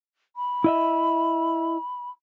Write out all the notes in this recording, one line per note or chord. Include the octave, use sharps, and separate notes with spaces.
B5
E4 D#5 E5